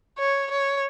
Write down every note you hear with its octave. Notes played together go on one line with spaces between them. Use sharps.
C#5
C#5